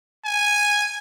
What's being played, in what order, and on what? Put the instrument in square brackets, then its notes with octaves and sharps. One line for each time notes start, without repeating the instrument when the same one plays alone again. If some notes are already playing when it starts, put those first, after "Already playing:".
[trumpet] G#5